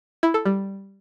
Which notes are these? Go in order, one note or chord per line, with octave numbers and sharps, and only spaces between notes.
E4
A4
G3